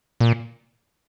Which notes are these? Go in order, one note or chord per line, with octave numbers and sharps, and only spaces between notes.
A#2